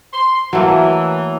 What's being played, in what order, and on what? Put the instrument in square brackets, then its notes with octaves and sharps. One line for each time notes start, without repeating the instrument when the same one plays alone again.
[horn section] C6
[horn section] E3 [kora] F#3 A3 A#3